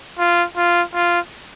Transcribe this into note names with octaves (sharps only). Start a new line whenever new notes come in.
F4
F4
F4